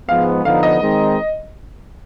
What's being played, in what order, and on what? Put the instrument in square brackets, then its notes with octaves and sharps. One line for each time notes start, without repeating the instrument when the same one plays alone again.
[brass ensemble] G#2 F3 G#3 B3 [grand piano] F5
[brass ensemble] D3 F3 B3 D#4 [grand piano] F5
[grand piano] D#5
[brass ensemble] D#3 G#3 C4 D#4